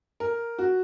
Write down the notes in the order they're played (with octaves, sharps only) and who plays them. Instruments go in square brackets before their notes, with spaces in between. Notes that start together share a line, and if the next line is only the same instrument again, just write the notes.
[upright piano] A#4
F#4